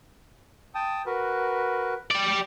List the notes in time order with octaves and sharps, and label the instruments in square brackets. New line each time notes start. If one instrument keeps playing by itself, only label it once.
[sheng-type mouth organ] G5 A5 D#6
F#4 A#4 B4
[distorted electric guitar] G3 D5